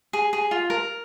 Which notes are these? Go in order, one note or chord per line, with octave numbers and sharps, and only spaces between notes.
G#4
G#4
F4
A#4